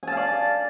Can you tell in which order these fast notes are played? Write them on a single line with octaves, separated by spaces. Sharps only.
G#5 A5 F5 D5